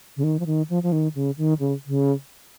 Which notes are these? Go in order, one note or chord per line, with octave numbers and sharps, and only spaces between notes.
C#3
D#3
F3
D#3
F3
F3
D#3
C#3
D#3
C#3
C#3